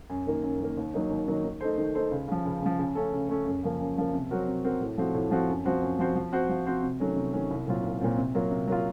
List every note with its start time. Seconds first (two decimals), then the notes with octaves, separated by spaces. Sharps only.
0.10 F#2
0.27 D#3 A#3
0.43 F#2
0.61 D#3 A#3
0.77 D#2
0.94 D#3 F#3 A#3 D#4
1.10 D#2
1.28 D#3 F#3 A#3 D#4
1.45 D#3
1.61 A3 D#4 A4 C5
1.78 D#3
1.95 A3 D#4 A4 C5
2.11 C#2
2.28 C#3 F3
2.45 C#2
2.62 C#3 F3
2.79 C#3
2.95 A3 C#4 A4
3.13 C#3
3.29 A3 C#4 A4
3.46 F#2
3.63 C#3 F3 A#3
3.80 F#2
3.97 C#3 F3 A#3
4.14 C3
4.31 F#3 C4 F#4 A#4
4.47 C3
4.64 F#3 C4 F#4 A#4
4.81 A2
4.98 F3 A3 C4 F#4
5.14 A2
5.31 F3 A3 C4 F#4
5.49 F#2
5.65 F3 C4 F#4 C5
5.82 F#2
5.99 F3 C4 F#4 C5
6.16 F3
6.32 C4 F#4 C5
6.49 F3
6.67 C4 F#4 C5
6.83 C3
7.00 D#3 F#3 A3 C#4
7.17 C3
7.33 D#3 F#3 A3 C#4
7.51 C2
7.67 A#2 F#3 C4 F4
7.83 C2
8.01 A#2 F#3 C4 F4
8.18 C3
8.35 F#3 A#3 F4
8.51 C3
8.67 F#3 A#3 F4